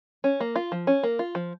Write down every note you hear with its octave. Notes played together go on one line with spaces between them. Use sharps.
C#4
A#3
F4
F3
C#4
A#3
F4
F3